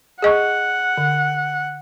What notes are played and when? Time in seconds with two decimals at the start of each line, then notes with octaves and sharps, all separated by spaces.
0.22 G#4 D#5 F#5 C#6
0.97 D3